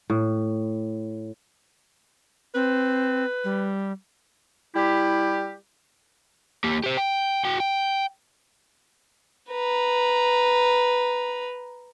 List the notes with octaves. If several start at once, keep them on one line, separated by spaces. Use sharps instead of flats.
A2
C4 B4
G3
G3 E4 G4
A#3 G4
G4 C5
G5
F#4 G5
G5
B4 A#5